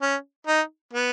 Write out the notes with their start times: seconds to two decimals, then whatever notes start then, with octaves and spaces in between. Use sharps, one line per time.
0.02 C#4
0.47 D#4
0.93 B3